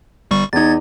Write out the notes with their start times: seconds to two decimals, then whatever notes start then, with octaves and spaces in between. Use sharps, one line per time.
0.31 G1 G3 C#6
0.53 E2 D#4 G#6 A6